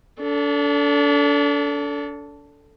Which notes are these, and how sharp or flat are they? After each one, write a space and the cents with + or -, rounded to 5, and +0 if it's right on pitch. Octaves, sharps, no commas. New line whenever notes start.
D4 -35 A4 +5